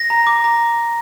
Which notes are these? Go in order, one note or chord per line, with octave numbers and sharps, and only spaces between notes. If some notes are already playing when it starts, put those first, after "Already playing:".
Already playing: A#6
A#5
D6
A#5